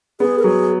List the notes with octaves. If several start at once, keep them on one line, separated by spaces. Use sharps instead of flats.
B3 G#4
A#4
F#3 G#4